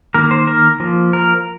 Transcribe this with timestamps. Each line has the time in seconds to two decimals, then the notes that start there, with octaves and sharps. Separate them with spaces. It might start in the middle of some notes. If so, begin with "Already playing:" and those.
0.14 D#3 A#3 A#4
0.31 C5
0.47 A#4
0.80 F3 A#3
1.13 A#4